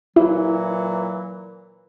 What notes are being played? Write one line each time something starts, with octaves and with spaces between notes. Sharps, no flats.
A#2 E3 F#3 E4